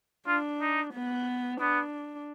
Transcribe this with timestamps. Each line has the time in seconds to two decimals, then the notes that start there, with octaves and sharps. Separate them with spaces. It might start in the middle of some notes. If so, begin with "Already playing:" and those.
0.27 D4 F4
0.61 D#4
0.94 B3
1.60 B3 D4